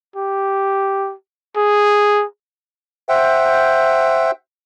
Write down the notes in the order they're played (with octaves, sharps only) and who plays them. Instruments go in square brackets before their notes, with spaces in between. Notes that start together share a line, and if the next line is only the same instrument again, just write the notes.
[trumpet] G4
G#4
[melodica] C5 E5 F#5 G5